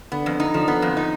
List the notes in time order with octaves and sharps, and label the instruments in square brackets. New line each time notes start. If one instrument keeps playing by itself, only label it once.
[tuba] D3 [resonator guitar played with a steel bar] B3
[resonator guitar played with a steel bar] F2
D#4
[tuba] D3 [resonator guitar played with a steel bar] F3
[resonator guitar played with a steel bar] B3
F2
D#4